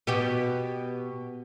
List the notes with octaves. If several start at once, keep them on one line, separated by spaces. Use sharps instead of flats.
B2 B3 G4